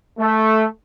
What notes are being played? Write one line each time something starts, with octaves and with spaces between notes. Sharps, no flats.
A3